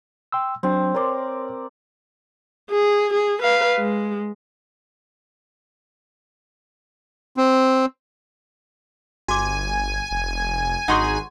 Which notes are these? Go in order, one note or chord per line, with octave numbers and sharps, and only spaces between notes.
G5 C6 E6
F#3 C4 D4
A#4 C#5 D5 C6
G#4
G#4
B4 F5
G#3
C4
G1 F#4 G#5 D6
F1
G#1 D#4 F#4 G#4 F#5 C6 C#6